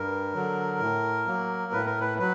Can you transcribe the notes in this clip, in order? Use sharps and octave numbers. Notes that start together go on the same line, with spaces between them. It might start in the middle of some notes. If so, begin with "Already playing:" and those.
Already playing: G2 A#4
D3 F#3
A2
F#3 A#3
A2 B4
A#4
B4
F#3 B4